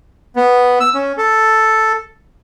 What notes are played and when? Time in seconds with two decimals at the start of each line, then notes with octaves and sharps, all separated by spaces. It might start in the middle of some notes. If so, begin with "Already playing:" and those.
0.36 B3
0.80 E6
0.94 C#4
1.17 A4